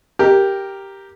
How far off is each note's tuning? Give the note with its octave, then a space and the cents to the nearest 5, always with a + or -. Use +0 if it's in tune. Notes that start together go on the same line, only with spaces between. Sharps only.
G4 +0 A#4 +0